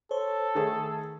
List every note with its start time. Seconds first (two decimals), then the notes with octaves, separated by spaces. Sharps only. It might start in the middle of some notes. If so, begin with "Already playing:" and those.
0.11 A4 C5 C#5
0.55 D#3 A3 G#4